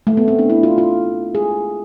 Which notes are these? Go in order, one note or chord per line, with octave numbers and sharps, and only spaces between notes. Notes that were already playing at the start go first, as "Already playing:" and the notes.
A3
B3
C4
D4
E4
F4
F4
G#4